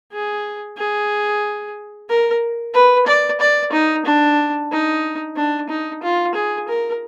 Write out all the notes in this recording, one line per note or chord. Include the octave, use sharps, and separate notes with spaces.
G#4
G#4
A#4
B4
D5
D5
D#4
D4
D#4
D4
D#4
F4
G#4
A#4